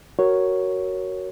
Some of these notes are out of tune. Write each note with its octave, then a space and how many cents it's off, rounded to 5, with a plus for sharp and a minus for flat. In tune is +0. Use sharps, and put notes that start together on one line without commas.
F#4 +15 A#4 +0 C#5 +0